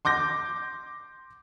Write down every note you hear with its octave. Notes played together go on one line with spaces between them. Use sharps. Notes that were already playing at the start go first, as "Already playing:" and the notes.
C6 D6 G6 A#6